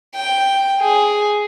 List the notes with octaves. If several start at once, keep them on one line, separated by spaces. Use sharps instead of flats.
G5
G#4